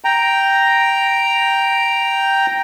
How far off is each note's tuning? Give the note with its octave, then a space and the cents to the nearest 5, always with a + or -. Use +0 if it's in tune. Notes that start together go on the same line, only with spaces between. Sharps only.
G5 +0 A#5 +0